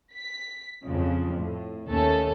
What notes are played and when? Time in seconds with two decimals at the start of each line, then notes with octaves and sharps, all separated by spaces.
0.14 B6
0.83 F2 C#3 F3
1.35 A2
1.87 D#2 A3 C#4 A4